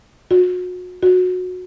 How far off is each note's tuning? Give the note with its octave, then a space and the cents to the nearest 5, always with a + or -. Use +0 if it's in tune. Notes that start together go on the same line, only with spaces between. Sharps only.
F#4 -35
F#4 -20